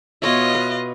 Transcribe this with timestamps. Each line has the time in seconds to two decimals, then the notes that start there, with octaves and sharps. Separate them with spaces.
0.22 B2 F4 C#5 D#5 E5
0.55 B4